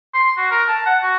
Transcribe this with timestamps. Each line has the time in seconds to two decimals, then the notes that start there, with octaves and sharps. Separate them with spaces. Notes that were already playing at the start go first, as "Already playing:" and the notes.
0.14 C6
0.37 F#4
0.51 A#4
0.68 A5
0.86 F#5
1.02 F#4